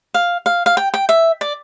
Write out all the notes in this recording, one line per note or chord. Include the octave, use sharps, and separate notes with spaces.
F5
F5
F5
G5
G5
E5
D5